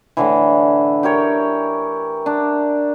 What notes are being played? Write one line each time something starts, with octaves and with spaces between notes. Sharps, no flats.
A2 D3 E3
G4 A#4 C#5
D4